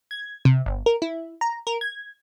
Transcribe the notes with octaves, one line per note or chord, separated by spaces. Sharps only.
G#6
C3
G1
A#4
E4
A#5
A#4
G#6